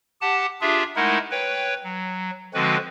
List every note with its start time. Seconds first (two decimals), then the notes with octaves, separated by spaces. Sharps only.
0.21 G4 F#5 A5
0.61 D4 F4 G4 G#4 E5
0.96 G#3 A3 D#4 E4 A#4 F#5
1.31 B4 C#5 G5
1.83 F#3
2.54 D3 F3 G#3 C4 F#4 B4